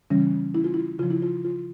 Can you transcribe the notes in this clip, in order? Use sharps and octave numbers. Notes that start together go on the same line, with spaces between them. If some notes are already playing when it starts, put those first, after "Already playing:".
C#3 E3 G3 C#4
E4
F4
E4
C#3 F3 F4
E4
F4
F4